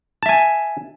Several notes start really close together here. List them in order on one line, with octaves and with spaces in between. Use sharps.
A5 E5 G#5